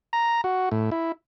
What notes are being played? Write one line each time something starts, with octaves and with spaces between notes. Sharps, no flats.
A#5
F#4
A2
E4